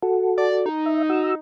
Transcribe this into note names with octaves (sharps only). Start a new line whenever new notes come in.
F#4 A4
D5
D#4
E5
F#4 E6